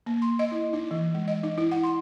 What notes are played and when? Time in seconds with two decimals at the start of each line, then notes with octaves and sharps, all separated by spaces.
0.06 A#3
0.22 C6
0.39 D#5
0.52 E4
0.73 D#4
0.91 E3
1.15 G#3
1.28 D#5
1.43 D#4
1.58 E4
1.72 F#5
1.83 C6